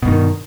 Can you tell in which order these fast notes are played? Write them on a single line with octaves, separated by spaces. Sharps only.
B2 G2 D#3